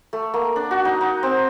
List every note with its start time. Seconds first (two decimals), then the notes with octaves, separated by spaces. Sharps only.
0.13 A3
0.34 A#3
0.56 D4
0.71 F#4
0.85 D#4
1.01 D#4
1.23 C4